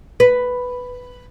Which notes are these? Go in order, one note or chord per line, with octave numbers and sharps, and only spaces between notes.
B4